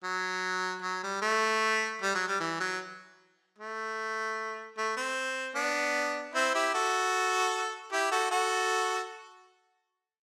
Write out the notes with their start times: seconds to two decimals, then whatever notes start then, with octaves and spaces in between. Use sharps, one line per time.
0.04 F#3
0.83 F#3
1.03 G3
1.22 A3
2.02 G3
2.15 F#3
2.28 G3
2.40 E3
2.60 F#3
3.58 A3
4.78 A3
4.97 C4
5.55 B3 D4
6.34 C4 E4
6.54 E4 G4
6.74 F#4 A4
7.92 E4 G4
8.11 F#4 A4
8.31 F#4 A4